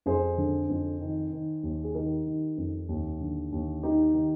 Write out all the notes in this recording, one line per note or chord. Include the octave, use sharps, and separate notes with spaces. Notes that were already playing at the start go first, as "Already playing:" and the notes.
F2 G#4 C5
D3
F2
D#3
D#3
D#2
G#4
D#3 G4 A#4
D#3
F2
D#2
D3
D#2
D#3 D#4 G4
D#3